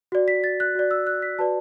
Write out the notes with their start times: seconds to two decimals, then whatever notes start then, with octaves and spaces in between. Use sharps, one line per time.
0.12 F#4 D5
0.28 B6
0.44 A6
0.60 F#6
0.75 F#4 D5
0.91 E6
1.07 F#6
1.22 B6
1.39 F#4 B4 D5 A5